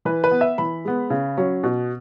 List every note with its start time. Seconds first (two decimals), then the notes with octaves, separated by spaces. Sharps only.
0.05 E3 B4
0.24 B4
0.31 B3
0.41 E5
0.58 E3 B5
0.85 G#3 B3
1.10 C#3
1.37 F#3 C#4
1.63 B2